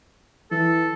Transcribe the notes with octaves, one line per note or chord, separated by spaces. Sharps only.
E3 A4